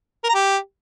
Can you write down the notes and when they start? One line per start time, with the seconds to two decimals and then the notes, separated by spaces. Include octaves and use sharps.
0.24 A#4
0.29 A#5
0.34 G4